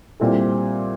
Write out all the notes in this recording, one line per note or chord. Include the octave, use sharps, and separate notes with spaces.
A#2 G3 C4 E4 A4